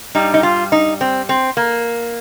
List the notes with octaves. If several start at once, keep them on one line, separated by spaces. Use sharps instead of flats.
G2 G3 D#4
D#4
F4
D#4
C4
C4
A#3